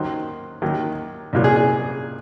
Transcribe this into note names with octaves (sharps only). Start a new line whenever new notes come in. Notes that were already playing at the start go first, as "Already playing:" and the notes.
Already playing: D#2 D#3 F#3 C5
D#2 D#3 F#3
C2 A#2 F#3
G#4
G#4